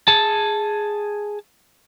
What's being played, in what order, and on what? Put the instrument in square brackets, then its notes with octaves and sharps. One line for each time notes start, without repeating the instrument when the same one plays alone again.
[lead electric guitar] G#4 A5